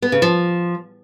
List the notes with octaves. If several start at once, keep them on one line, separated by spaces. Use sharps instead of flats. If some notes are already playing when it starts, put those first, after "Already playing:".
B3
C#3
F3